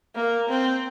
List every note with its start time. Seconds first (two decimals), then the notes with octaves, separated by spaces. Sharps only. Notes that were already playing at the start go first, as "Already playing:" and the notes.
0.16 A#3
0.50 C4